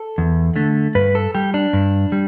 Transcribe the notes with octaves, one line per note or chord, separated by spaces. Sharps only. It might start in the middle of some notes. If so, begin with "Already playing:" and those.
Already playing: A4
E2
D3 A3
G2 B4
A4
G3 G4
D4
G2
G3